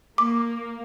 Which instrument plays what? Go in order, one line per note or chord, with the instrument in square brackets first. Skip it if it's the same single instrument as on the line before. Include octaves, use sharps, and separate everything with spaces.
[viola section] A#3 [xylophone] D6